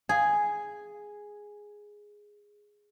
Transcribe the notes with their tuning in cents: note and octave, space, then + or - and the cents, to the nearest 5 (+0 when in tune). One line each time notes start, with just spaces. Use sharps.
G#4 +0 G#5 +0